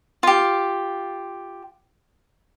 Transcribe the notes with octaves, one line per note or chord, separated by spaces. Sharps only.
F4 G4